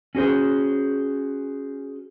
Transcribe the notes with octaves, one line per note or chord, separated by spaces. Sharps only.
C#4 F#4 G#4 C5